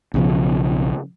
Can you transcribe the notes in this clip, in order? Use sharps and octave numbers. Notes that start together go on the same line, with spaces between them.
B1 C#3 F3